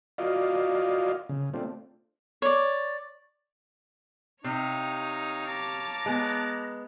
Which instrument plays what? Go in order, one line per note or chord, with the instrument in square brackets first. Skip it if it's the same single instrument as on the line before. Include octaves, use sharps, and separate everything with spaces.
[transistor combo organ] F4 F#4 D5 D#5 F5
C#3
A3 C4 D4 F4
[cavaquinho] C#5 D5
[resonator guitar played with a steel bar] C3 [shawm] D#4 [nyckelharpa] C#5 F5
[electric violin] A5 D6 [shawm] A#5
[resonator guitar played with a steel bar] G#3 B3